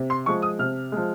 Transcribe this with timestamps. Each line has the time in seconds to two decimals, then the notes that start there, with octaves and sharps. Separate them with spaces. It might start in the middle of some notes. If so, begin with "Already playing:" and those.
Already playing: C3
0.10 C6
0.26 F3 G#3 C#6
0.42 D#6
0.59 C3 F6
0.92 F3 G#3